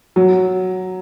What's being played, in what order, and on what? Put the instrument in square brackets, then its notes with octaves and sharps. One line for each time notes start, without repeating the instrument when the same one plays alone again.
[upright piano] F#3